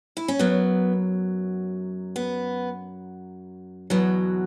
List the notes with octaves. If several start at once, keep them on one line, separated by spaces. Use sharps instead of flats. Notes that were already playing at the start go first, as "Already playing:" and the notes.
E4
C#4
F#2 F#3 B3
B3
E2 B2 F#3 B3